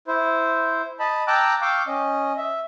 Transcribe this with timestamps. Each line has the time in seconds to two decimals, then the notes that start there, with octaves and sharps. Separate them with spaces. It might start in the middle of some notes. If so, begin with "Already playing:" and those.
0.07 E4 C5
0.99 D#5 A5 B5
1.27 G5 A5 A#5 D6 E6 F#6
1.61 F5 G5 C#6 D6 E6
1.87 C#4 D#5
2.37 E5